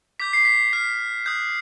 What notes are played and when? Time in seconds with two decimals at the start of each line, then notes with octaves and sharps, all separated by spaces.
0.20 D6 G6 B6
0.33 C7
0.45 B6
0.73 D6 F6 B6
1.26 D#6 F#6 G6